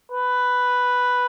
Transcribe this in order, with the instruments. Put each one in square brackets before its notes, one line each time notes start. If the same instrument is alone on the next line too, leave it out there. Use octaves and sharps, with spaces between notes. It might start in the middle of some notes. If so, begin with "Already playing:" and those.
[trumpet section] B4